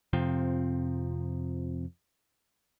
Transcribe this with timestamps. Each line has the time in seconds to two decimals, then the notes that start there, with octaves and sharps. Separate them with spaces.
0.13 F2 C3 F3 C4